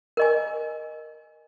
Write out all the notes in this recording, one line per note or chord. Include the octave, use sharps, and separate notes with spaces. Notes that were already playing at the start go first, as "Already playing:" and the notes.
A#4 D#5 G#5